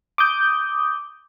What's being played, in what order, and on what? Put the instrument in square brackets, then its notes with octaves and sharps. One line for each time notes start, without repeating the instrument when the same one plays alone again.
[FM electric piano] D6 D#6 G6